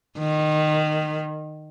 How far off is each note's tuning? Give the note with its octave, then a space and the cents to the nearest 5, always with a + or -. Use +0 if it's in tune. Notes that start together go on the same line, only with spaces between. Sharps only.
D#3 -20